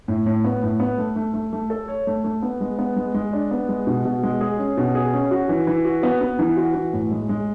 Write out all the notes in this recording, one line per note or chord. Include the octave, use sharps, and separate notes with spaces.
A2
A2
B3
A2
B3
A3
A3
A3
A3
A4
C#5
A3
A3
B3
G#3
B3
G#3
G#3
D4
B3
G#3
B2
B2
G#3
G#4
C#4
B2
G#4
C#4
F#4
E3
E3
F#4
B3
B3
E3
F#4
E3
A2
G#3
G#3